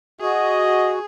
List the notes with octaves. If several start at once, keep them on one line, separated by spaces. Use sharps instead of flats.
F#4 G#4 D#5